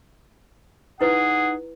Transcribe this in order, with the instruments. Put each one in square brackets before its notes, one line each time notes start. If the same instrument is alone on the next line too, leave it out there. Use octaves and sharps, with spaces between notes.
[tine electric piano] D#4 [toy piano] E4 B4 [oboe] G#4 [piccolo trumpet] F#5